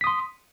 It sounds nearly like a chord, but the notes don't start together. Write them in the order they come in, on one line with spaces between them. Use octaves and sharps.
B6 D#6 C6